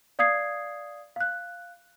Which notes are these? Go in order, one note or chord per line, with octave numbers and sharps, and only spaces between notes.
D5 F5 D#6 G#6 C7
F5 F#6